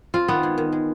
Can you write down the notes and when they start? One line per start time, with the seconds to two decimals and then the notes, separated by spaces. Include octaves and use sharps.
0.14 C4 F4
0.28 D#3 B3
0.43 G#3
0.58 D#3
0.72 G#3